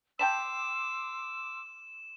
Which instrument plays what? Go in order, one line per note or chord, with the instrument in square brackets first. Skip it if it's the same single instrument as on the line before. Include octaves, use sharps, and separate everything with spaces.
[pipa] G5 A5 B5 [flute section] C6 D6 E6 [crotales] E7